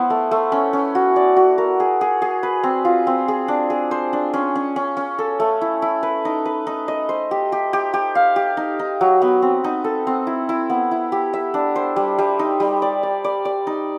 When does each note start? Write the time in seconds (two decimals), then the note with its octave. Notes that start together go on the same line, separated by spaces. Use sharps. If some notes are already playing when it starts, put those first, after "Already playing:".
Already playing: B3 E4 C5
0.10 A3
0.31 A3
0.52 C#4
0.73 C#4
0.95 F#4
1.16 D5
1.36 F#4
1.58 A#4
1.80 G#4
2.01 G#4
2.22 G#4
2.43 B4
2.63 C4
2.85 F4
3.07 C4
3.28 G#4
3.48 D4
3.70 G#4
3.91 C5
4.13 D4
4.34 C#4
4.56 C#4
4.76 C#4
4.97 C#4
5.18 A4
5.40 A3
5.61 E4
5.82 E4
6.03 B4
6.25 D#4
6.45 B4
6.67 D#4
6.88 D#5
7.09 C5
7.31 G4
7.52 G4
7.73 G4
7.94 G4
8.15 F5
8.36 G4
8.57 D#4
8.79 D#4
9.01 F#3
9.22 B3
9.42 C4
9.64 D#4
9.84 A4
10.07 C4
10.27 E4
10.49 E4
10.70 B3
10.91 E4
11.12 G4
11.33 E5
11.54 D4
11.76 C5
11.96 G3
12.19 G3
12.39 D#4
12.60 G3
12.82 D5
13.03 D5
13.24 D5
13.45 D5
13.67 D#4